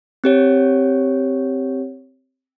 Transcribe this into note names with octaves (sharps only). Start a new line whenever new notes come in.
C4 G4 C#5